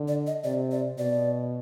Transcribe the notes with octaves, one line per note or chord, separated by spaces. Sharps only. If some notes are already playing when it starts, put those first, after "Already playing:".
Already playing: D3
D5
D#5
C3 D5
D5
B2 D5